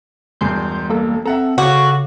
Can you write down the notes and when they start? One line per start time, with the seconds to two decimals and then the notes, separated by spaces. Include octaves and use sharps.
0.41 E1 E2 G2 C6 G6
0.89 G3 A#3 A4
1.25 C4 A4 E5 F#5 A#5
1.58 C#3 F#4 C#5 F5 D6